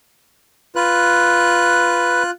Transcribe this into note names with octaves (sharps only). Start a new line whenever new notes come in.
F4 B4 F#6